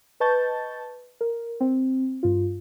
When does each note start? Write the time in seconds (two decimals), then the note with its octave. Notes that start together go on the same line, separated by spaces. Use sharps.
0.20 B4 D#5 A5 C#6 G6 A6
1.21 A#4
1.60 C4
2.23 G2 F4